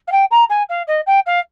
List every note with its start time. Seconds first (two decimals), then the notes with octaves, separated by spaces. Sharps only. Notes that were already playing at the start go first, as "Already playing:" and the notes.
0.07 F5
0.12 G5
0.31 A#5
0.50 G#5
0.69 F5
0.87 D#5
1.07 G5
1.26 F5